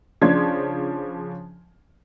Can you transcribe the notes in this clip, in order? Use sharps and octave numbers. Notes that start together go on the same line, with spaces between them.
C#3 F3 C#4 D4 C6 G#6